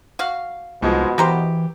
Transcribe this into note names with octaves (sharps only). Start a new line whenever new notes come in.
F#4 F5
C2 G#2 B2 F3 G#3
E3 F#4 G4 A#4 C5